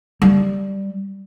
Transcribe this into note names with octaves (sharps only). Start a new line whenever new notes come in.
G3